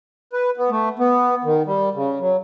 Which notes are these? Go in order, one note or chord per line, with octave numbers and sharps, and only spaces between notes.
B4
B3
A3
B3
D#3
G3
C#3
F#3